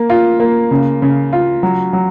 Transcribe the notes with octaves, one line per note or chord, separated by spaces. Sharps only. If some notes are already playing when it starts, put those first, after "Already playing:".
Already playing: A#3
F4
A#3
C#3
C#3
F4
F#3
F#3